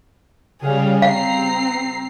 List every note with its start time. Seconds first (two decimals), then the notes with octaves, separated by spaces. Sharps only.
0.61 C#3 G3 G#4 F5
1.02 C4 F5 A#5 C7